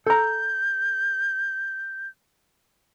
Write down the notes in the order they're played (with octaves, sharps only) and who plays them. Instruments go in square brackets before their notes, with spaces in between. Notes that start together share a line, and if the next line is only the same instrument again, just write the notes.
[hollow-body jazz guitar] A4 A#5 [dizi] G6